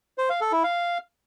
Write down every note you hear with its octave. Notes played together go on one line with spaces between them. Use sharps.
C5
F5
A4
E4
F5